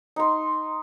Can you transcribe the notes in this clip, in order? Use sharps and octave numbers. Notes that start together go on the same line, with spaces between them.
D#4 C6